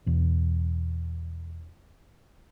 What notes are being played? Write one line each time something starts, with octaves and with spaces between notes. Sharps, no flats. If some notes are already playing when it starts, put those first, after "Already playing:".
E2 B2